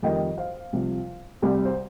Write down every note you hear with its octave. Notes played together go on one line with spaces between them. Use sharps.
F2 D#3 G3 D#5 G5
C5 F5
C2 C3 F3
C2 C3 G3
C5